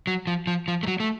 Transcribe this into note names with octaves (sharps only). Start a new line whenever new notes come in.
F#3
F3
F3
F3
A3
F#3
A3